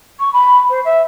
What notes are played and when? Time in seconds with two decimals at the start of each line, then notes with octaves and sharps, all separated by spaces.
0.19 C#6
0.33 B5
0.69 C5
0.84 E5